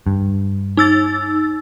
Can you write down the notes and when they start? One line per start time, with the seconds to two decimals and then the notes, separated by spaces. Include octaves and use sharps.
0.07 G2
0.77 D#4 E6 A6